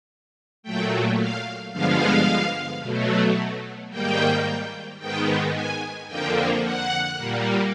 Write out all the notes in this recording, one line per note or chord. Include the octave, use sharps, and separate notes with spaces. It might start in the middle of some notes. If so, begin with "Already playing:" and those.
A#2 F#3 A3 G5
F5
G2 D3 F3 G#3 B3 F5
B2 F#3 A3
G#2 D#3 G3 A#3 G5
G#2 D#3 G#3 B3 G5
G#5
F2 D3 F3 A#3 G5
F#5
A#2 G3 A#3